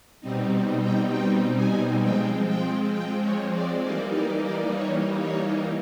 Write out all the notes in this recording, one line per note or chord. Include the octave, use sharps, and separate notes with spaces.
B2 G3 C4 D#4
G5
G5
G#5
F3 G#3 C4 G5
G5
G5
C#5
D5
E3 G3 A#3 D#4 D5
D5
D5
C#5
C#5